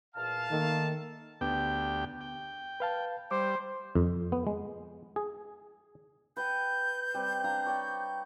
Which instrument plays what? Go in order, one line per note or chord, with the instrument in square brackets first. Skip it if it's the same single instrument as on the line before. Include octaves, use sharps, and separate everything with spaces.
[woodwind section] E2 A#2 F6 [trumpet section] F5 A5
[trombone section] D#3 A#3 [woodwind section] A3 A4
[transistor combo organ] D2 G4 G5 [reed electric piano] B3
[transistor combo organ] G5
[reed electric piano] B4 F5 A5
[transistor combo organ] G3 [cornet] C5 [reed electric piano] D6
[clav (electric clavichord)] F2
B3
G#3
G#4
[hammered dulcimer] B4 F#5 G5 [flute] G6
[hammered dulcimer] G3 C4
D4 F5 A#5
C#5 D5 G5